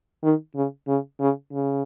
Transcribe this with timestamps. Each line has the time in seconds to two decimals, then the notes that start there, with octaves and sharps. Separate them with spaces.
0.23 D#3
0.55 C#3
0.88 C#3
1.20 C#3
1.53 C#3